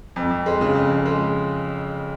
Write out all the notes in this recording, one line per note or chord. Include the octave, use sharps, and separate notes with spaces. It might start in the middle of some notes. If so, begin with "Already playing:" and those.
F2
F2
G#3
C#3
F2
F2
G#3